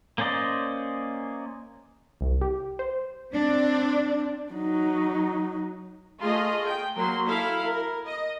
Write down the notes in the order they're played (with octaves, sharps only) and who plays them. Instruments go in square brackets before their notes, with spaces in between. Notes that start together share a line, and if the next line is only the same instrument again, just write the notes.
[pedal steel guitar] A#3 C#4 C5 D5 D#5
[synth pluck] C2
G4
C5
[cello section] C4 D4
[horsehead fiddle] F#3 D#4
[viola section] A3 F4 G#4 D#5
G5
F#3 A#3 C6
E4 A4 F5
A#4
D#5